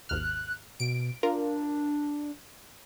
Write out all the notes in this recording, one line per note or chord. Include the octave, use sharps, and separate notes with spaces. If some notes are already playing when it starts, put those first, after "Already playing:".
G#1 D#2 F6 F#6
B2 D7
D4 F4 A#4